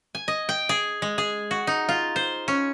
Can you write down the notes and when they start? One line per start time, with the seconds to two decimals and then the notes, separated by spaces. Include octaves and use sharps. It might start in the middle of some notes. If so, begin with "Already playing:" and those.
0.15 G#5
0.28 D#5
0.49 G5
0.69 G#4
1.02 G#3
1.18 G#4
1.51 F#4
1.67 D#4
1.89 F4
2.16 C5
2.48 C#4